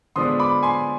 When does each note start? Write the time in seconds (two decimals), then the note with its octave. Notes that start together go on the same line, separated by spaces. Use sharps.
0.16 D3 F3 G#3 B3 D4 C6 D#6
0.40 B5 D6
0.63 G#5 C6